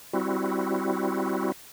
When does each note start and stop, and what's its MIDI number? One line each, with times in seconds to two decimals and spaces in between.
0.13 1.52 55
0.13 1.52 60
0.13 1.52 64
0.13 1.52 66